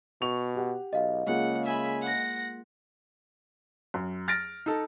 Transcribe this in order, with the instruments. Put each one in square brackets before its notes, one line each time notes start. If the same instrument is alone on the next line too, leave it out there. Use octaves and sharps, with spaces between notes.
[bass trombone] B2 [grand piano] C#6 F7
[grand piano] G4 F#5
[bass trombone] B1 [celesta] D#5 F5
[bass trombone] C#3 [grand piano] G#3 A#3 F4 [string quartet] F#5
[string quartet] E5 G#5 B5
F#5 A#6
[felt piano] F#2
F6 A6 A#6 D7
D#4 A4